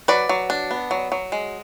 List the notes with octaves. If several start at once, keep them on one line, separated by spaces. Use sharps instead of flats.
F#3 B4 D5
F#3
D4
B3
F#3
F#3
G#3